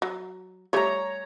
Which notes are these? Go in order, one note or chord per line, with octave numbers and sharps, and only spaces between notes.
F#3
G3 A3 C#5 A#5